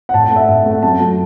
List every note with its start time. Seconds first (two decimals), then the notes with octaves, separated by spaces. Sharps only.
0.09 F#5
0.13 A2 A5
0.25 F#5
0.31 A3 E5
0.48 A2
0.66 A3
0.71 F#5
0.82 F#2 A5
1.00 F#3 A3